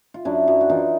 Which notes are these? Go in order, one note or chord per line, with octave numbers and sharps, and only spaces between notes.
F4
F#2 D4 E4
F#2
F#4
E3 D#4 F4